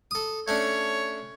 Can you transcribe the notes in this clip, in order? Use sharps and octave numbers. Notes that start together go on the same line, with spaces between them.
A4 D#6
A3 C#4 D4 C#5